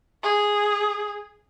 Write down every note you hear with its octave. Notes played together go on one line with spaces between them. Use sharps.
G#4